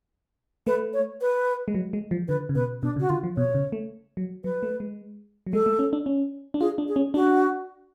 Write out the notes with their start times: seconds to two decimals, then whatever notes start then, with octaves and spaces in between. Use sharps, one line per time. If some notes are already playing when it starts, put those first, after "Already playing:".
0.67 A3 B4
0.93 C#5
1.21 B4
1.68 G#3
1.75 F#3
1.93 G#3
2.11 F3
2.28 D3 B4
2.49 C#3
2.55 B2 B4
2.82 B2 D4
2.96 C#3
3.00 F#4
3.09 D3 F4
3.24 F3
3.36 B2 C#5
3.55 C#3
3.72 A3
4.17 F#3
4.44 F#3 B4
4.63 A3
4.80 G#3
5.47 F#3
5.53 G#3 A4
5.66 A3
5.79 C#4
5.93 D4
6.06 C#4
6.54 D4
6.61 F4 G#4
6.78 D4
6.88 G#4
6.96 C#4
7.14 D4 F#4